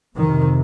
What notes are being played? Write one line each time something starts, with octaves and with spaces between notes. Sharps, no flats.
F2 C3 D#3